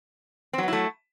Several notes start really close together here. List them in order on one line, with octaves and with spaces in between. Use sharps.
C4 F#3 B3 E4 A3